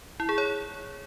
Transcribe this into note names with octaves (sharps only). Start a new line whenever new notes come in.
E4
G#4
C#5